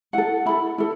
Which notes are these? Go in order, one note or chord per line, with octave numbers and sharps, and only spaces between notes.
E4 A4 F#5
E4 A4 B5
E4 A4